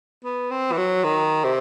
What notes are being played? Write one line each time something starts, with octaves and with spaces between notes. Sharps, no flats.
B3
C4
E3
F#3
D#3
C3